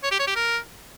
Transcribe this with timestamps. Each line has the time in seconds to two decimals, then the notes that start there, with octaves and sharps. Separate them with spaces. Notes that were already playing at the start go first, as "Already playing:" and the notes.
0.03 C#5
0.11 G4
0.19 C#5
0.27 G4
0.35 A#4